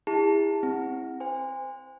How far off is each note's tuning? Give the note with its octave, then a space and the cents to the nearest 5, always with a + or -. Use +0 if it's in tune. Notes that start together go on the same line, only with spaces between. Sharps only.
E4 +0 G#4 -45 A5 +0
C4 +10 E4 -10
C5 -20 G#5 -35